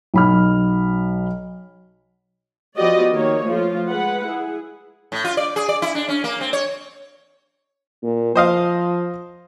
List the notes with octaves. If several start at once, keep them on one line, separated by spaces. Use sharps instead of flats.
B1 B5 F6
F3 B3 F#4 G4 D5 D#5
D#3 A#3 C#5
F3 A3 F4
G#3 B4 F#5
E4 G#4
A2
F4
D5
G#4
D5
E4
D4
C#4
A#3
C4
C#5
A#2
F3 C5 D#5 F5